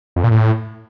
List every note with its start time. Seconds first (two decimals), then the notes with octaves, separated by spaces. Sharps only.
0.16 F2
0.24 A#2
0.31 A2